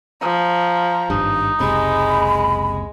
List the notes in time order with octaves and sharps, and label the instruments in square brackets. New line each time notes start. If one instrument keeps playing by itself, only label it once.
[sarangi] F3 [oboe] A#5
[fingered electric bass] G#1 G2 [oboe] D#4
[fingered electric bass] F#1 C#2 C3 [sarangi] G#3 [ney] B5